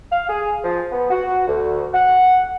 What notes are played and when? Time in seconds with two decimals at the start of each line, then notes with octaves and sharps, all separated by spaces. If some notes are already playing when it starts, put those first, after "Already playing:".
0.11 F5
0.29 G#4
0.63 F3
0.91 B3
1.10 F#4
1.47 D2
1.94 F#5